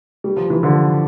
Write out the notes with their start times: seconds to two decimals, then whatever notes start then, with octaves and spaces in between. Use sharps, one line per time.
0.24 G3
0.37 F3
0.50 E3
0.63 D3 F3